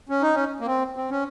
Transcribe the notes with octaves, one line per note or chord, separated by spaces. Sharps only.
C#4
D#4
C#4
A#3
C4
C4
C#4